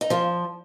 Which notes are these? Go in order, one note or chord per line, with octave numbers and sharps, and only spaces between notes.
D#4
F3 F4